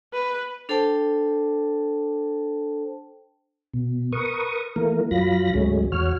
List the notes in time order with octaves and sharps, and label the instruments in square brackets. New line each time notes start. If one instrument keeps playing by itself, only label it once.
[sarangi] B4
[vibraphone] D4 A4 C5 G5 A5
[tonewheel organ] B2
A#4 B4 C#6 D#6
E3 A3 A#3 A#4
F#2 F#3 F4 B5 A#6
D2 G#2 F#3 G#3 A3 C#4
E2 F#4 C#5 F6